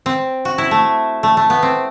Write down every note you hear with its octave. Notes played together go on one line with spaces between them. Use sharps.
C4
F#4
E4
A3
A3
A3
B3
C4